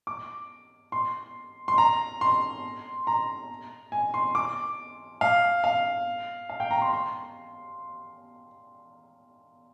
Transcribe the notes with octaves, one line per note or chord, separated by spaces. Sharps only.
D6
C6
C6
A#5
C6
A#5
G#5
C6
D6
F5
F5
F5
G5
A#5
C6
C6